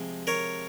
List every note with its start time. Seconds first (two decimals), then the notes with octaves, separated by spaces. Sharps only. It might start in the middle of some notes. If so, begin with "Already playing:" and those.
Already playing: C3 F3 G#3
0.27 A#4 C#5